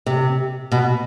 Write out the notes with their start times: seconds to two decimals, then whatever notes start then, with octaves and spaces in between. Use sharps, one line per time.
0.06 C3
0.72 B2